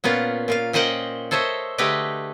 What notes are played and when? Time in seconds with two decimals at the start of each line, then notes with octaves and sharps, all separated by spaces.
0.04 A#2 B3 C#4 F4
0.48 A#2 F4 F5
0.73 A#2 C#4 C5 D#5 F#5 G5
1.31 A4 C5 C#5 D#5 E5
1.78 D3 A3 G4 G#4 B4 D#5